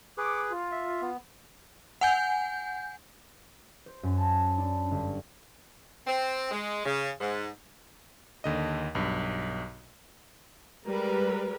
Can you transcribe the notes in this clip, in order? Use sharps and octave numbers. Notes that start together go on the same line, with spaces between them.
G#4 B4 C#6 D6
F4
E5
B3
F#5 G#5 G6
C5
F#2
A5
D4
G1
C4
G#3
C#3
G#2
D#2 D3 D#5
B1 G2
G3 G#3 A#4 B4